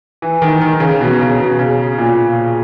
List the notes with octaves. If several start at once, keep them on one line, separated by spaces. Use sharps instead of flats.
E3
D#3
D#3
D#3
C#3
B2
C#3
B2
C#3
A#2